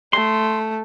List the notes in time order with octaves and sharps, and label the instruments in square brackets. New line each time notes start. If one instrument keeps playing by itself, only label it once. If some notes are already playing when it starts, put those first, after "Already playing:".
[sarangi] A3 [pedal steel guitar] C6